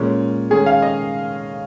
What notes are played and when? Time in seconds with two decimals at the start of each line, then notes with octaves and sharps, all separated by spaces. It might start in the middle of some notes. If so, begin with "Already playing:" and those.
Already playing: A#2 G#3 C#4
0.50 D#3 G#3 C#4 G#4
0.66 F5
0.82 D#5